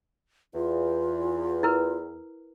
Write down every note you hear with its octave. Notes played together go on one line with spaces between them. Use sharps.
E2 F4
E4 A#4 B4